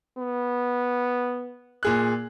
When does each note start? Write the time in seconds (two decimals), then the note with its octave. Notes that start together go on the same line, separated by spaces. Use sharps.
0.18 B3
1.83 A#2 G#4 F#6